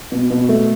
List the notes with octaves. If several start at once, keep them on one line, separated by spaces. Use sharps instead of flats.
B2
B2
A3